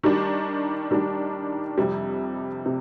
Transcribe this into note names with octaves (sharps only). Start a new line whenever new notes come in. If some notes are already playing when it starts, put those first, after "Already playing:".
D#3 G3 D4
D#3 G3 D4
F2 C3 G3
C3